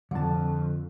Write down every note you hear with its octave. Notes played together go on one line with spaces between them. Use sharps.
F2 D3 A5